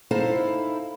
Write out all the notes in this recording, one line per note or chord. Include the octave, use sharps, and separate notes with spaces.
D#4 E4 A4 C5 F5